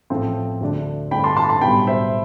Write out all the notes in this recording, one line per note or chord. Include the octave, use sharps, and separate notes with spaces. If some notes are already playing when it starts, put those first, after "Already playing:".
A1 A2 F3 A3 C4
D2 D3 A3 D4
G2 D3 A3 C4 G5 B5
A5 C6
A5 C6
A5 C6
B1 A2 G3 B3 G5 B5
C5 E5